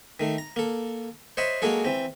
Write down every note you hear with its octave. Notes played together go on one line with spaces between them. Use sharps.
D#3 A3
A#5
A#3 A4
C5 C#5 D#5 E5 F#5 B5
F#3 G#3 A#3 F#4 G#4 A4
E3 C4